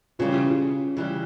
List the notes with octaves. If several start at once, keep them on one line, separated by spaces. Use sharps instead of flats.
C#3 E3 G3 C#4 F4
C#3 E3 G3